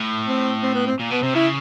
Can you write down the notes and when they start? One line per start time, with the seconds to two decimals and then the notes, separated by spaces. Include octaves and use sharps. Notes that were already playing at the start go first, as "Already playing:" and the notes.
Already playing: A2
0.27 C4
0.63 C4
0.75 B3
0.87 C4
1.00 A#2
1.11 B2 B3
1.23 C3 C4
1.35 C#3 E4